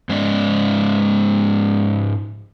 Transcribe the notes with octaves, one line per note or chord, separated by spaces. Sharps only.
G#2 G#3 C#4 D5 D#5